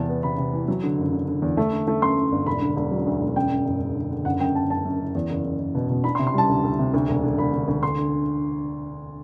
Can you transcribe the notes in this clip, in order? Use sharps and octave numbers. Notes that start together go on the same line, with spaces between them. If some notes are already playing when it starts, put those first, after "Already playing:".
Already playing: E2 C3 A5
B3
C3 B5
C3
E3
F#3
D3
F#1
D3
D3
E2
A3
D3
A3
F#2 C6
F#2
G1
E1 B5
D3
E1
F#3
D2
E1
F#2 G5
F#2
F#1
F#2
D3
D3
F#1 F#5
F#2 G5
F#2 A5
F#1 A5
F#2
F#1
E2
F#1
F#1
F#1
B2
B2
D4 B5
C6
C3
C6
G3 A5
D2
D2
C3
D2
E1
D3
E1 B5
D3
D2
D3 C6
D3